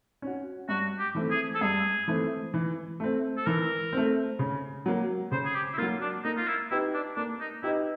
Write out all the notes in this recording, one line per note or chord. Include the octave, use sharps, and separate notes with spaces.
C#4 F#4
G2 F#4
G4
E3 A3 C4
G#4
A4
G2 G#4
E3 A3 C4
E3
A3 C4
A4
E3 A#4
A3 C4
C#3
F#3 A#3
C#3 C5
G#4
G4
E4
F#3 A#3 F4
D4
A#3 D#4
F4
E4
D#4 E4 G4 B4 D#5
D4
A#3 D4
D#4
D#4 E4 G4 B4 D#5